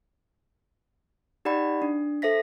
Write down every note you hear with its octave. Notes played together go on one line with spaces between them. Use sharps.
D#4 G4 D5 F#5 B5
D4
A4 C5 E5 A#6 B6